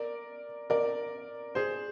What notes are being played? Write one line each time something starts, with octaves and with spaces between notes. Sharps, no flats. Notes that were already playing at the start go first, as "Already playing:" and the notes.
Already playing: A#4 D5
A#4 D5
G#4 C5